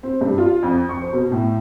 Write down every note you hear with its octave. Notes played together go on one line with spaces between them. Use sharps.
C4
G2
F4
F2
C#6
C5
B2
A2